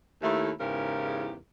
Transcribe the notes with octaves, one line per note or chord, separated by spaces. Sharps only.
D#2 A3 E4
E2 G#2 C#3 E4 G4 A#4